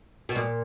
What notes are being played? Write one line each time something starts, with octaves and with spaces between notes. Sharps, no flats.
B2
A#2